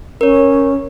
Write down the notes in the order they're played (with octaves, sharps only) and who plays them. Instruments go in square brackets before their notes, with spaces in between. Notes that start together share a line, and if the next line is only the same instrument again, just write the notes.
[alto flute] C#4 [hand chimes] A#4 C#5